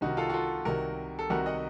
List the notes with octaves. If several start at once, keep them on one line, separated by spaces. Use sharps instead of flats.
C2 C3 D#3 D#4 F#4
F4 A4
F#4
F4 A4
C2 C3 D#3 F#4 A#4
A4
C2 C3 D#3 F#4 A#4
D#5 F#5